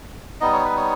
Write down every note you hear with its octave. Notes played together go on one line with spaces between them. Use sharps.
G3 B3 D#4 D#5
C#5
B4
C#5